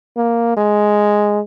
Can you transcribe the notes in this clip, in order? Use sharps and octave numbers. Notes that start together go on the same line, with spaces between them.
A#3
G#3